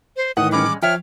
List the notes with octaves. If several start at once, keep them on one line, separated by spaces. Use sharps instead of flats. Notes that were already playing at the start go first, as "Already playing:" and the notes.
C5
A2 D#3 E3 F#5 D#6
G3 G#3 C#4 D6
F3 C#5 E5 G5 F6